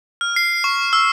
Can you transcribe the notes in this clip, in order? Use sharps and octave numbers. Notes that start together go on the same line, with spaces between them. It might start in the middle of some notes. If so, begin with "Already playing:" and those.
F6
C7
C#6
E6